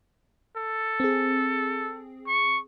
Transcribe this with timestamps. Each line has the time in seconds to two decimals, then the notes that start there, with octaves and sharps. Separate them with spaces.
0.57 A4
1.00 C4 G#4
2.27 C#6